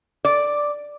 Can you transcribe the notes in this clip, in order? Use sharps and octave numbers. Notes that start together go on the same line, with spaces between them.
D5